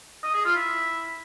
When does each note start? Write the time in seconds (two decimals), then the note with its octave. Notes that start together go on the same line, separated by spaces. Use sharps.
0.23 D#5
0.34 G#4
0.45 F4
0.55 E4